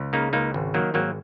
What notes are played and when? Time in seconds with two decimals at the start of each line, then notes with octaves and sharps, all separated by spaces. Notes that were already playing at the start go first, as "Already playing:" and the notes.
Already playing: C#2
0.13 C#3 A#3 D#4
0.33 C#2 A#3 D#4
0.54 G#1
0.74 D#3 F#3 A#3
0.94 G#1 F#3 A#3